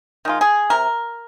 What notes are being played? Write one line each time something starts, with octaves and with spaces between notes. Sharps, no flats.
D#3 G#3 F4
G#4
C3 A#4